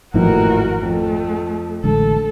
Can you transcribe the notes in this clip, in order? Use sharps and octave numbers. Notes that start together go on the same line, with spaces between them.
G#1 F2 A2 E3 F3 A#3 F#4 A#4
F2 A3
A1 D3 G#3 A4